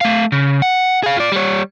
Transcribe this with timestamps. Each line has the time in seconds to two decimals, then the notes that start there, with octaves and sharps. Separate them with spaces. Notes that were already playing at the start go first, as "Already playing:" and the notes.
0.01 A3 F5
0.32 C#3
0.62 F#5
1.03 G#4 F5
1.17 F4 D5
1.32 G3 C#5